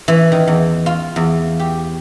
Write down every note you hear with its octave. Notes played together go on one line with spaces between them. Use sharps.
E3
D#3
E2
F4
E2
G4